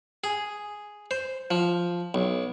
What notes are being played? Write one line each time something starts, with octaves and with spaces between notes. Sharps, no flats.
G#4
C5
F3
B1